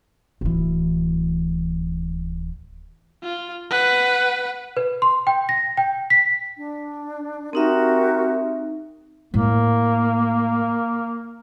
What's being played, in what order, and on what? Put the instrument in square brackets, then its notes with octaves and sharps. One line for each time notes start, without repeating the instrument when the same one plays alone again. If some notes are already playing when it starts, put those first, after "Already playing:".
[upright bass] D1 E3
[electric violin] F4
B4 F#5
[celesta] B4
C6
G5
A#6
G5
B6
[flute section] D4
[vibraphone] C4 D#4 E5 [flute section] F#4 G4 A#4
[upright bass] A2 A3 [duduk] A#3